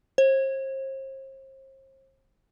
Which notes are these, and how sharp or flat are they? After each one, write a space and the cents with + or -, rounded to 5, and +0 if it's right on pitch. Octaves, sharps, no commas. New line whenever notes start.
C5 +40